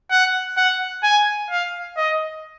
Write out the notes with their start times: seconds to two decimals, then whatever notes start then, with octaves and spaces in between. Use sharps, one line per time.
0.11 F#5
0.57 F#5
1.03 G#5
1.50 F5
1.97 D#5